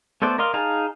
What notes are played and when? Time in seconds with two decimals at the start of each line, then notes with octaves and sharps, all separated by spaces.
0.22 A3 B3 A4 C5 D5
0.38 A#4 D5 D#5 F5 C6
0.54 D#4 G#4 F5 A5 A#5